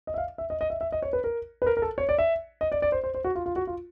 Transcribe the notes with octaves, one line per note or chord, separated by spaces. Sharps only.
D#5
E5
F5
E5
D#5
D#5
E5
E5
D#5
C#5
B4
A#4
B4
A#4
A#4
A4
C#5
D5
E5
D#5
D5
D5
C5
C5
C5
F#4
F4
F4
F#4
F4